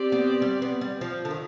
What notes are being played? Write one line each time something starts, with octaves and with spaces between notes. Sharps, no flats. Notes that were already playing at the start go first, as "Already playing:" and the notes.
Already playing: C4 G4 D5
B3
G3
B3
G3
F3
D3
D#3